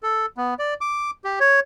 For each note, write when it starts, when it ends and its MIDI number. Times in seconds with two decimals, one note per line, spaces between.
0.03 0.26 69
0.37 0.54 59
0.59 0.74 74
0.81 1.11 86
1.24 1.39 67
1.40 1.60 73